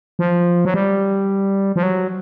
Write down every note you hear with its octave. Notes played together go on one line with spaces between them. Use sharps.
F3
F#3
G3
F3
F#3